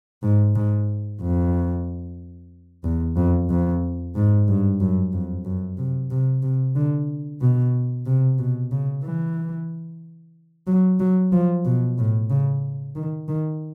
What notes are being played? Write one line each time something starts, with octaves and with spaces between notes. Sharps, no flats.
G#2
G#2
F2
E2
F2
F2
G#2
G2
F#2
F2
F#2
C3
C3
C3
D3
B2
C3
B2
C#3
E3
F#3
F#3
F3
B2
A2
C#3
D#3
D#3